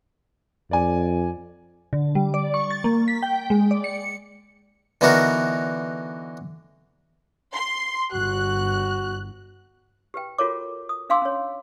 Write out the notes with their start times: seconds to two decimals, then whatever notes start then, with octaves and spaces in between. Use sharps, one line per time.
0.71 F2 D5 G#5
1.93 D3
2.15 G3
2.34 D5
2.54 C#6
2.71 A6
2.84 A#3
3.08 B6
3.23 G5
3.50 G#3
3.71 D5
3.84 C#7
5.01 D3 E3 B3 D#4 F#4 A#4
7.53 C6
8.12 G1 F#4 F#6
10.14 G4 B4 G5
10.38 F4 F#4 A4 A#4 C#5 D6
10.89 D#6
11.10 D4 F5 G#5 C6 D6 E6
11.22 C#4 C#5